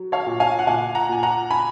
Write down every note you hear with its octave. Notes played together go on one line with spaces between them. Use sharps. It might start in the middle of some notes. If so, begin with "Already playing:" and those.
Already playing: F#3
C#5 F5
A#2
F5 G#5
F#5
A#2 F5 G#5
F#5 A#5
A#2 G#5
F#5 A#5
G#5 B5